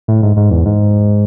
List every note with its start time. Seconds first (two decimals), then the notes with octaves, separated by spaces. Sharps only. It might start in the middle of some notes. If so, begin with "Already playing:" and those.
0.08 A2
0.23 G#2
0.37 G#2
0.51 E2
0.66 G#2